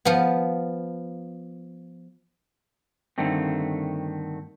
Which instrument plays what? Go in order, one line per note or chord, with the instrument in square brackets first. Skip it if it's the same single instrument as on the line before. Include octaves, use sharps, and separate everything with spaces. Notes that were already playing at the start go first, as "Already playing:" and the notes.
[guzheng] F3 B3
[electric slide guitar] G2 D3 D#3 A3 C4